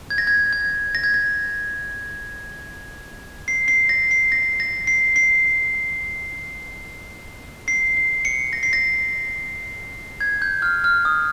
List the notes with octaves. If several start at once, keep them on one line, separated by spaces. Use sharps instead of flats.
G#6
A#6
G#6
G#6
A#6
G#6
A#6
C7
C7
A#6
C7
A#6
A#6
C7
C7
C7
C7
C#7
A#6
C7
A#6
G#6
G6
F6
F6
D#6